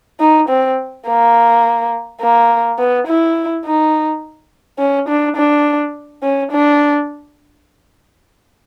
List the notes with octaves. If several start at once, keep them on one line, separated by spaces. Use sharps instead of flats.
D#4
C4
A#3
A#3
B3
E4
D#4
C#4
D4
D4
C#4
D4